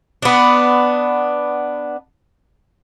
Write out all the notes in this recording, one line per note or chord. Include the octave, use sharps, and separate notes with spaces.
B3 D4